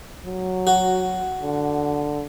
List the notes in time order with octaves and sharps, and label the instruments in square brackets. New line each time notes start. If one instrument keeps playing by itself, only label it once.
[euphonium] F#3
[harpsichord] F#4
[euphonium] D3